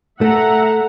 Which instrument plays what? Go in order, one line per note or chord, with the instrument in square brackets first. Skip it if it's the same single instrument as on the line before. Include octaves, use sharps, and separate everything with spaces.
[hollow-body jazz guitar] A3 [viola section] E5 F#5 A#5